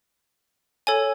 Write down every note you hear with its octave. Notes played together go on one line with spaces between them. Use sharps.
A4 C#5 G#5